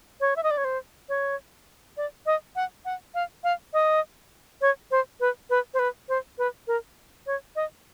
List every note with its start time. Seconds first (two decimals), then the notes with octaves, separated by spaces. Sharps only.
0.21 C#5
0.36 E5
0.43 D#5
0.51 D5
0.58 C#5
0.65 C5
1.09 C#5
1.97 D5
2.26 D#5
2.56 F#5
2.85 F#5
3.15 F5
3.44 F5
3.73 D#5
4.62 C#5
4.91 C5
5.20 B4
5.50 B4
5.74 C5
5.79 B4
6.09 C5
6.38 B4
6.68 A#4
7.27 C#5
7.56 D#5